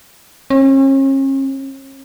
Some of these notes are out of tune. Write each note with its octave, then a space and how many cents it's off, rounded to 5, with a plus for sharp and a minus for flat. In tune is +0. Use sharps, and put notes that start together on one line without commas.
C#4 -40